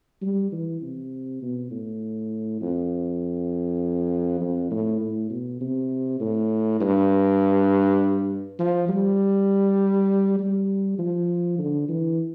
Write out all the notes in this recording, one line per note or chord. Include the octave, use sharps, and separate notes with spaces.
G3
E3
C3
B2
A2
F2
F2
A2
A2
B2
C3
A2
G2
F3
G3
G3
F3
D3
E3